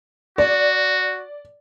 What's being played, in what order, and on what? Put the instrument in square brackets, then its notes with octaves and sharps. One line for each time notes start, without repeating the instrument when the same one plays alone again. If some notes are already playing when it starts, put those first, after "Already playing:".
[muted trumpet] F#4 [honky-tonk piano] D5